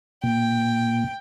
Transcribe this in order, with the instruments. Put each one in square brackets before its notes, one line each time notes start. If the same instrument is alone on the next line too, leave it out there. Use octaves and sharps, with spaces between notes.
[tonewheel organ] A#2 [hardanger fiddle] G5